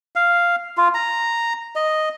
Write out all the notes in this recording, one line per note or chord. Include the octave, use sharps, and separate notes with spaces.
F5
F4
A#5
D#5